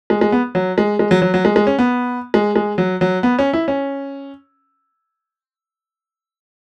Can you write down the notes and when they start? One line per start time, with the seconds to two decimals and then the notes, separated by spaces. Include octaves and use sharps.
0.10 G#3
0.21 G#3
0.32 B3
0.55 F#3
0.78 G#3
0.99 G#3
1.11 F#3
1.22 F#3
1.34 F#3
1.45 G#3
1.56 G#3
1.67 C#4
1.79 B3
2.34 G#3
2.56 G#3
2.78 F#3
3.01 F#3
3.23 B3
3.39 C#4
3.53 E4
3.68 C#4